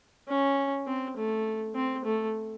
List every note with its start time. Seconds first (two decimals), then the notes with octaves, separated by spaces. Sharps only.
0.28 C#4
0.87 C4
1.16 A3
1.75 C4
2.05 A3